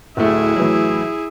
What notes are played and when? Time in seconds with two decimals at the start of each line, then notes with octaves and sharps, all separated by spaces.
0.17 D1 A3 E4 G#4
0.56 A2 E3 F#3